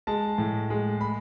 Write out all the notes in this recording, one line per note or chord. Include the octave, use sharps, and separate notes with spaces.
G#3 A5
A2
G#3
B5